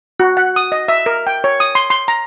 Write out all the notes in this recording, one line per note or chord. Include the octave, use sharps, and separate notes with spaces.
F#4
F#5
D#6
D#5
E5
A#4
G5
C#5
D#6
C6
C6
A#5